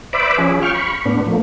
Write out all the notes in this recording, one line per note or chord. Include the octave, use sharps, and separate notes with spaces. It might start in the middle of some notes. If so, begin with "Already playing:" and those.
B4 C5 D5 E5 B5 D6
F3 C#4 G#4
F5 G5 C#6 F6
B5 C#6
A2 B3 D4
F3 A3 A#3